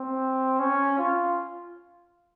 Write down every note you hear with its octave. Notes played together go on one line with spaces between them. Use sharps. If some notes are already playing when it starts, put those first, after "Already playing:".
Already playing: C4
C#4
F4